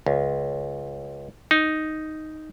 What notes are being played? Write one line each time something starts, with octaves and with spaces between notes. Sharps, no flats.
C#2
D#4